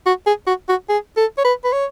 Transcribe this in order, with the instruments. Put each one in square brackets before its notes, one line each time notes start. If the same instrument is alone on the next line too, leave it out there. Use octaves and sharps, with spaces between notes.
[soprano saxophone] F#4
G#4
F#4
F#4
G#4
A4
C#5
B4
B4
C#5